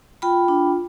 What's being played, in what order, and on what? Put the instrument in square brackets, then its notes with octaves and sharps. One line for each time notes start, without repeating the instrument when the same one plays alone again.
[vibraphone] F4 G5 B5
D4